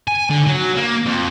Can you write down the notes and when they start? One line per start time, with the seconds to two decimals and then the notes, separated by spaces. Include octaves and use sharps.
0.08 G#5
0.30 D3
0.47 F#3
0.77 A#3
1.05 F2